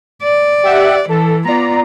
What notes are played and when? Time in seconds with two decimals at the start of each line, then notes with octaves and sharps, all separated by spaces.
0.23 D5
0.63 G4 E5 F#5
1.09 E3 A4
1.44 B3 F4 D5 A#5